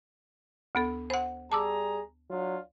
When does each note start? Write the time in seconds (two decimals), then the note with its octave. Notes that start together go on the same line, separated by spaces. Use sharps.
0.75 D2 B3 A4
1.10 C5 F#5
1.52 G3 G#4 A5 A#5 D6 E6
2.30 F#3 D4 F4